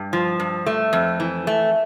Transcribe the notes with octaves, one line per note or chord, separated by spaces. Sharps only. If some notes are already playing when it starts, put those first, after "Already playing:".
Already playing: G2
F3
G2
A3
F2
E3
A3